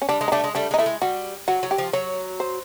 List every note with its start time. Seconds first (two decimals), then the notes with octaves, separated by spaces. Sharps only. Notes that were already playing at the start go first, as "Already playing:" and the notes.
0.02 C#4
0.09 G3 D4
0.21 G#3
0.28 D#4
0.32 G3 A3 D4
0.44 G#3
0.55 G3 A3 D4
0.71 G#3 D#4
0.78 A3 E4
0.86 G#3
1.01 G3 F#4
1.48 F#3 F#4
1.63 F#3
1.71 G4
1.78 F3
1.93 F#3 C#5
2.40 C5